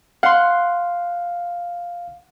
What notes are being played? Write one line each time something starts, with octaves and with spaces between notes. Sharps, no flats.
F5 F#5 C6